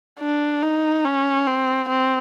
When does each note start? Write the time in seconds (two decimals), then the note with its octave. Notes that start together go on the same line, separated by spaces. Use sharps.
0.20 D4
0.62 D#4
1.05 C#4
1.47 C4
1.88 C4